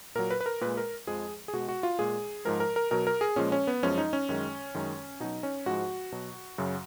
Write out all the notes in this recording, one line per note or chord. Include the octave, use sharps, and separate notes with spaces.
A#2 F#3 A#4
B4
B4
A#4
A#2 G#3 B4
A#4
F2 F3 G#3 G#4
G#4
B2 G#3 F#4
F#4
F4
A#2 G#3 G#4
G#2 F3 G#3 A#4
A#4
A#4
B2 F#3 A#4
A#4
G#4
A#2 F3 G#3 C#4
C#4
B3
F#2 F3 G#3 C#4
D#4
C#4
F#2 D#3 G#3
F#2 D#3 G#3
B2 F#3 D#4
C#4
G#2 F3 G#3 F#4
B2 F#3
F#2 C#3 F#3